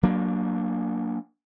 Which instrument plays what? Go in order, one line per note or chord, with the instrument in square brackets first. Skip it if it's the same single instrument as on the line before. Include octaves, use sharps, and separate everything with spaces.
[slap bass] F#3 A#3 D4